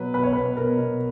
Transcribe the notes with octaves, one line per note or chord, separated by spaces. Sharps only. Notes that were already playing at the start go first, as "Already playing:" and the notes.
Already playing: B2 F#3 B4
B2 B4
C#5
B2 B4
B2 A#4
B2